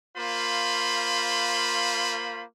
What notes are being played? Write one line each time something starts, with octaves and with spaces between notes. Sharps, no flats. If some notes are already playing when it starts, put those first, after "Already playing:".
A#3 F4 C5 B5